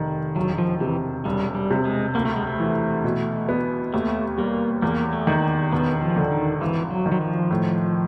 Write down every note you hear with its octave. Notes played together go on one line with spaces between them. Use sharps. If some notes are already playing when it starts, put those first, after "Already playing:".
Already playing: F1 D#3
E1 F#3
F3
C3 E3
E1 G3
G3
C3
G#3
D2 A#3
A3
G#3
A3
E3
B2
B3
D#2 A3
G3 A#3
E2 A#3
A3
D#3
E1 B3
F3
D3
D#3
G#1 E3
F#3
D#3
F#3
F3
A2